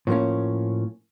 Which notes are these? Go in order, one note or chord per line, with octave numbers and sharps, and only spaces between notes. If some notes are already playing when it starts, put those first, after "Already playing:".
A2 F3 A#3 C#4